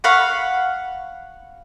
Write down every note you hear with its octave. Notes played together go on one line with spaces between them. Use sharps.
F5 F#5 B5 C#6